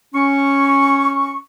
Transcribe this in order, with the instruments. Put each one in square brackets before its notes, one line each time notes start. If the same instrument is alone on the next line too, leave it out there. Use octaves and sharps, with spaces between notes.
[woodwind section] C#4 C#6